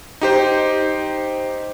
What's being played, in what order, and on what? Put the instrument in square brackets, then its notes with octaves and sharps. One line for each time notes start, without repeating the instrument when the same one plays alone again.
[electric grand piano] D#4 G4 C5